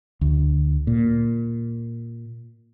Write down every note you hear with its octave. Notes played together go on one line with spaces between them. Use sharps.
D2
A#2